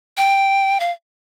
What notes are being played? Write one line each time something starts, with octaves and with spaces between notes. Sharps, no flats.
G5
F5